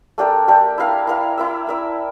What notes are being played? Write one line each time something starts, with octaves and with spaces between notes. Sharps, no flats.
A3 D4 G4 A#4
A3 D4 G4 A#4
E4 A#4 F5
E4 A#4 F5
E4 A#4 E5
E4 A#4 E5